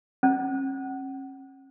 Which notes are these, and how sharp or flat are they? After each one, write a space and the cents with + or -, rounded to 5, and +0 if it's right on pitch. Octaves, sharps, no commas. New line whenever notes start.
C#4 -40